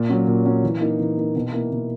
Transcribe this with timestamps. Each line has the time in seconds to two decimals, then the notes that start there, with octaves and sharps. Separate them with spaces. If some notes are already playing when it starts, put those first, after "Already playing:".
Already playing: A#2
0.09 F#3 C#4
0.27 A#2
0.45 F#3 C#4
0.64 E3
0.81 A#3 D#4
0.99 E3
1.17 A#3 D#4
1.36 B2
1.53 A#3 E4
1.71 B2